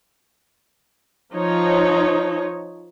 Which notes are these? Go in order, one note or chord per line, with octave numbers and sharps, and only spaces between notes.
F3 D#4 C#5